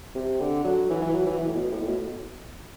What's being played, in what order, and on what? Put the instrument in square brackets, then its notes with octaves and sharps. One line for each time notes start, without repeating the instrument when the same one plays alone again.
[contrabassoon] C3
D3
F#3
E3
E3
F#3
E3
E3
A2
B2
A2
A2
B2